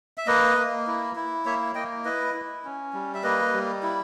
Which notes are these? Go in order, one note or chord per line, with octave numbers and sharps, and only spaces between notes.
E5
A#3 B4 D#5
A#3
E4
E4
A#3 C#5 E5
A#3 D#5 G5
E4 B4 D#5
E4
C#4
G3
E5
A#3 B4 D#5
G3
E4